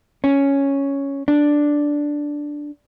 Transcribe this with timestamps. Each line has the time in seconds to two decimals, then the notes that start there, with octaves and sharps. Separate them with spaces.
0.24 C#4
1.28 D4